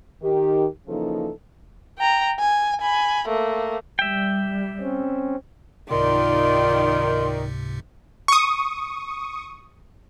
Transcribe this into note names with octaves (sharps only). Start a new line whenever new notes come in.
D#3 G4
C#3 E3 F3 A#3 D#4 A4
G5 A#5
G#5
G#5 B5
A3 A#3
G3 E5 G5
C4 C#4
C#2 G#2 C3 D#3 F4 D5 C6
C#6 D#6